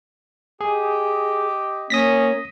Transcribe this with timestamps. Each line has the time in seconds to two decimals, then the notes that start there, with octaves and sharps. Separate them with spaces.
0.61 G4 G#4 D#5
1.90 A#3 C#4 D#6 A#6 B6